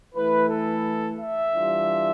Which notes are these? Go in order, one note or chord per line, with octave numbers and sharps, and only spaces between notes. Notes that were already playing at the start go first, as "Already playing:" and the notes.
E3 A3 E4 B4
A4
E5
E3 G3 D4 F4